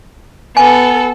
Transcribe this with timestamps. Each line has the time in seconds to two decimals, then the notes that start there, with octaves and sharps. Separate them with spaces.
0.57 B3 A4 G#5